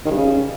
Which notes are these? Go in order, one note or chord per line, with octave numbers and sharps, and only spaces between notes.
D#3
G2
C#3